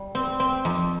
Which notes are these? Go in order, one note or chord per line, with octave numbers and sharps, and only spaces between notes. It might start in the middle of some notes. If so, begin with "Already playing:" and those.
Already playing: G3
C4
C4
F2